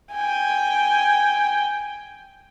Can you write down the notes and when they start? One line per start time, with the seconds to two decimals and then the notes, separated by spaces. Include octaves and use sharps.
0.13 G5 G#5